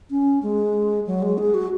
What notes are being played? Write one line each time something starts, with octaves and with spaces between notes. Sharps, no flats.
C#4
G#3
F#3
G#3
G#4
F#4